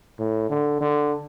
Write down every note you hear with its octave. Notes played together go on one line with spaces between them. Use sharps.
A2
D3
D3